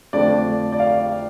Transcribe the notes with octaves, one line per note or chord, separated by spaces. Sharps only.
F2 D3 F3 A3 D4 D5
D5
F5